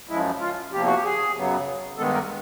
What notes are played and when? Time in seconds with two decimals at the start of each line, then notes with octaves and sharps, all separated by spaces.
0.09 F#2 C#3 F3 G#3 E4
0.41 F4
0.72 E2 C3 F3 A#3 G4
0.86 F#4
0.95 G4
1.04 G#4
1.35 F#2 C#3 F#3 B3
1.98 G2 D#3 G#3 B3 A4
2.14 A#4